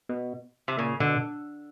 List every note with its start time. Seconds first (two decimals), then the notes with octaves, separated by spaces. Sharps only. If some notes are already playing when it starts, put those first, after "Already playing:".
0.09 B2
0.68 C3
0.78 A#2 C#3
1.00 B2 D3